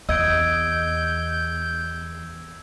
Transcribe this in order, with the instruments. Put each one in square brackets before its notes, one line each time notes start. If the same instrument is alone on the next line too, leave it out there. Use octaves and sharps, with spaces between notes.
[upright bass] E2 [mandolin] D#5 [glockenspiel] E6 G#6 D7 [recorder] G6